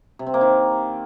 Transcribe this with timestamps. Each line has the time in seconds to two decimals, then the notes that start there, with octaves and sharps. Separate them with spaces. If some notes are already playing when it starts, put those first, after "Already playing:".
0.19 C3
0.27 C4
0.34 A#3
0.41 D#3